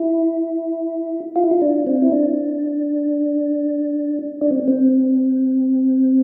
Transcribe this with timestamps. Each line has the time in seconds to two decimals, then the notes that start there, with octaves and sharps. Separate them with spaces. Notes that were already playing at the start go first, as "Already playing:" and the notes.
Already playing: E4
1.36 F4
1.44 E4
1.51 F4
1.62 D4
1.87 C4
2.02 E4
2.12 D4
4.41 D4
4.51 C4
4.68 C4